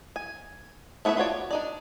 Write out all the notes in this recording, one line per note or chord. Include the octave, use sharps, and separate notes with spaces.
G#5
A3 B3 E4 G#4 E5
F4 F#4 C#5 D5
D4 D#4 D5